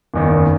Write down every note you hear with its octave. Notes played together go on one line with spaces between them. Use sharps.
F#1 E2 D#3